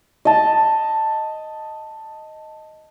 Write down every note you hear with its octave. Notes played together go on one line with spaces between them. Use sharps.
D#5 A5